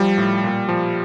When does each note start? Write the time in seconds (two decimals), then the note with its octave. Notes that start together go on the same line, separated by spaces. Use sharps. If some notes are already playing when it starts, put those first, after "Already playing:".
Already playing: F3 G3
0.18 A2
0.44 A#2
0.69 F3